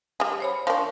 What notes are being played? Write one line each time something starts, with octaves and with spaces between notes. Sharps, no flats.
G3 G#4
C5 C#5 B5
F3 D4 A#4 G5 C#6